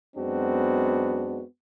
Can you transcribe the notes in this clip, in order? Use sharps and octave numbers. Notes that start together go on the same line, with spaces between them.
F#2 G#3 B3 C4 D4 F#4